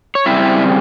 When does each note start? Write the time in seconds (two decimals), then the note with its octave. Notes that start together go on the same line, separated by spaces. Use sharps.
0.15 C#5
0.26 C#3 G3 C4 E4 E5